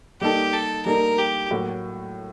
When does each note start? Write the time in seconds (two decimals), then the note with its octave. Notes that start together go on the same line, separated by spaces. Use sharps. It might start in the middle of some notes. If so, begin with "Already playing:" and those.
0.21 G3 A#3 D#4 G4 A4
0.54 A4
0.86 G3 A#3 D#4 A4 A#4
1.18 G4
1.50 A2 F#3 A#3 F#4